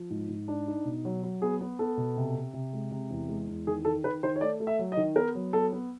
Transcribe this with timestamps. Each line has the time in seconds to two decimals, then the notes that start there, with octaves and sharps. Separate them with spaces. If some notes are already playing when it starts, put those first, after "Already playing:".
Already playing: F3
0.10 G#2
0.29 G#2
0.48 D4
0.67 D#4
0.85 B2
1.05 F#3
1.23 F#3
1.42 B3 G#4
1.61 B3
1.79 B3 A4
1.97 B2
2.17 C3
2.36 C3
2.54 C3
2.73 G#3
2.91 C3
3.10 E2
3.28 G#3
3.48 E2
3.67 D#3 G#4
3.85 D#3 A4
4.04 D#3 B4
4.23 D#3 C5
4.36 C#5
4.41 A3 D5
4.60 A3
4.67 E5
4.79 F#3
4.92 D#5
4.97 D#3
5.16 B3 A#4
5.35 F#3
5.53 B3 A4
5.73 B3